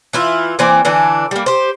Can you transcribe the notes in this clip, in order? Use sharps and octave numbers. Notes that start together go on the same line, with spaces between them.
E3 E4 F4
E3 A#3 C4 D5
D3 E3 D4
G3 A#3
G4 C5